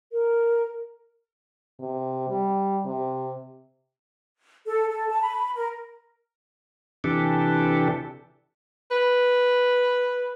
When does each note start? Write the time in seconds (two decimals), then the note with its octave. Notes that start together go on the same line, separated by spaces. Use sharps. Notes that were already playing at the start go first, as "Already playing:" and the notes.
0.12 A#4
1.79 C3
2.29 G3
2.85 C3
4.66 A4
4.89 A4
5.09 A5
5.21 B5
5.55 A#4
7.04 C3 E3 D4 G4 A4
8.91 B4